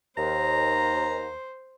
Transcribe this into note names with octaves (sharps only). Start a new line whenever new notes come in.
D#2 C5 A#5